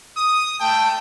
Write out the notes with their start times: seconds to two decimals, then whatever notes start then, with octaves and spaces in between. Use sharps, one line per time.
0.16 D#6
0.60 A3 G5 A5